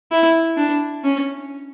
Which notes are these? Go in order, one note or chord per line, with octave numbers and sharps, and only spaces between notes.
E4
D4
C#4